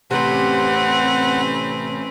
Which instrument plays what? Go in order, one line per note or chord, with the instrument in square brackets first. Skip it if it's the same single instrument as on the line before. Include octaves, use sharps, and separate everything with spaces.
[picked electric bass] A1 A2 [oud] C3 [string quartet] C4 C#4 B4 [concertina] F#5